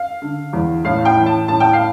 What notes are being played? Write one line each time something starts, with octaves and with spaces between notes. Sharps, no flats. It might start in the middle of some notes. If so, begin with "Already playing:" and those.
Already playing: F5
D3
E2
A2 F5
G5
E3
A5
A2 A5
G5
F5